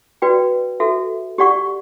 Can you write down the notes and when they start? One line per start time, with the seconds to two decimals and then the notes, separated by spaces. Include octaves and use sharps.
0.22 F#4 B4 D5 G5
0.80 F#4 A4 E5
1.38 G4 D5 F#5 C#6